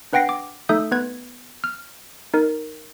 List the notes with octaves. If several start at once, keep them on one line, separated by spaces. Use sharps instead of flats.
D4 B4 F#5 G5 A#6 C7
D6
A3 D#4 A4 E5 D#6 G6
B3 B4 G#6
F6
D#4 A#4